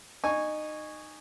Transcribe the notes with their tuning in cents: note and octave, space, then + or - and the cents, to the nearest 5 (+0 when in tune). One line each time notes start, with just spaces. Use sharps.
D#4 -20 G#5 -10 C#6 +5